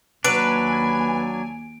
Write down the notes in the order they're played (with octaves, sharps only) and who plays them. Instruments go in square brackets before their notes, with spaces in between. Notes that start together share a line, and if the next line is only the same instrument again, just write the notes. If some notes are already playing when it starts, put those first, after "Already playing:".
[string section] D#2 G#5 [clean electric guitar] F#3 D4 [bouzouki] B4 [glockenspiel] D7